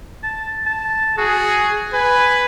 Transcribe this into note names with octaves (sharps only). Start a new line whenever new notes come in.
A5
A5
F#4 G#4
B4 G#5